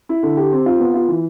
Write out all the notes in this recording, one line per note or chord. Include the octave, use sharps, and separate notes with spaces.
E4
D3
G4
C4
F4
B3
F4
E3